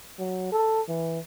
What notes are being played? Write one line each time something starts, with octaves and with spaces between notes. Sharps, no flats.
F#3
A4
E3